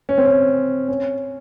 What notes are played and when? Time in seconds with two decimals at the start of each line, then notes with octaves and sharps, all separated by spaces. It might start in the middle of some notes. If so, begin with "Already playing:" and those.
0.09 C#4
0.18 C4
0.26 C#4
0.88 C#4